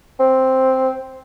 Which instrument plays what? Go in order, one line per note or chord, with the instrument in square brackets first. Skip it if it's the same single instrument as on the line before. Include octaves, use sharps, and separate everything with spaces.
[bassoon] C4